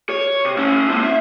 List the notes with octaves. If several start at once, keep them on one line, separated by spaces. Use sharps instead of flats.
C#5
C3
C#4 E4
A#3 C4
E5